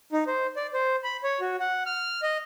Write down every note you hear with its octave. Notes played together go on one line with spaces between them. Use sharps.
D#4
C5
D5
C5
B5
C#5
F#4
F#5
F6
D#5